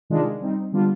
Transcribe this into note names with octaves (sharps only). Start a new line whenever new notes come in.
C3 D#3 G#3 D4 F4
G3 C4 D#4
D3 G3 B3 D4 F4